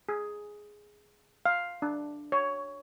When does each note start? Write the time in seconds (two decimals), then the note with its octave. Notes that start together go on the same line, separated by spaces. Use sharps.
0.09 G#4
1.46 F5
1.82 D4
2.32 C#5